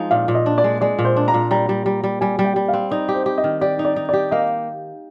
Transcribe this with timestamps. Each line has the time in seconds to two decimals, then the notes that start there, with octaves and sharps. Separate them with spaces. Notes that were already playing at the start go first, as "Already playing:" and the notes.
Already playing: F3 G#3 D#4
0.11 A#2 F5
0.28 A#2
0.35 D#5
0.46 D4
0.58 D5
0.64 G#3
0.81 G#3 D5
0.99 A#2
1.05 C5
1.16 D4
1.28 A#5
1.34 A#2
1.51 G3 A#5
1.69 G3
1.86 G3
2.04 G3
2.21 G3 G#5
2.39 G3
2.45 G5
2.56 G3
2.68 F5
2.74 C4
2.91 D#4 D5
3.09 G4
3.15 C5
3.26 G4
3.38 D#5
3.44 D#3
3.61 G4 D5
3.79 D#4
3.85 D5
3.96 D#4
4.09 G4 D5
4.31 A#3 D#5